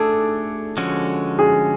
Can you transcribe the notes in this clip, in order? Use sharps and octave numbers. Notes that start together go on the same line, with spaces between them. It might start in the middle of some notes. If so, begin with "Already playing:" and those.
Already playing: A3 D4 G#4 A4 D5
D3 F3 G#3 C#4 F#4
G#4